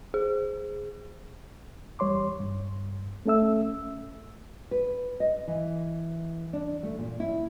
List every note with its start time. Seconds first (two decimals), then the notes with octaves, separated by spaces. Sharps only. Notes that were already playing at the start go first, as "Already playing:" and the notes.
0.14 G#4
1.99 E2 G3 C#5 C6 D6
2.40 G2
3.26 A3 C#4 A4 E5 E6
4.71 B4
5.20 D#5
5.48 E3
6.53 D4
6.83 A3
6.99 A#2
7.20 E4